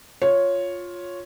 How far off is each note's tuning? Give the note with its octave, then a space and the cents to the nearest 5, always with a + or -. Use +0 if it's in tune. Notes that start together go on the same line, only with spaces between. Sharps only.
F4 +10 C#5 +0